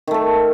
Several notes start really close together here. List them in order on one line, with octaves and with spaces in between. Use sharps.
D#3 A3 A4